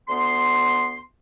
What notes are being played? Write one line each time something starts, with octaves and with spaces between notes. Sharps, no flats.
D2 B3 C6